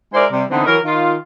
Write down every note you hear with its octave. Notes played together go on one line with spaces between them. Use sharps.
G#3 E4 A#4 C5 D5
C3 G3
D3 E3 B3 C4 D#4
E3 F#3 A#4
D#3 F4